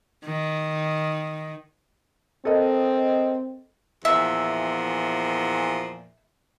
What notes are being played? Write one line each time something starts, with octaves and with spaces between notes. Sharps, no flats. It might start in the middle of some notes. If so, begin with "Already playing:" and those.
D#3
C4 A4 A#4 D#5
E2 A#2 F3 E5